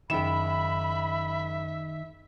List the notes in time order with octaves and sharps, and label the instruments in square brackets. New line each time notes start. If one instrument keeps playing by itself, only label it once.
[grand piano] F#1 E7 [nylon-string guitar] D#3 G5 [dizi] E5 [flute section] B5